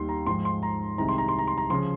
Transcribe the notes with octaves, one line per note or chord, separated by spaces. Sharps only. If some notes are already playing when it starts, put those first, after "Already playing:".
Already playing: D#2 D#3 G3 C6
A#5
G#2 F3 G#3 C6
C6
A#5
C2 C3 D#3 G#3 A#5
C6
A#5
C6
A#5
C6
A#5
C#3 F3 C6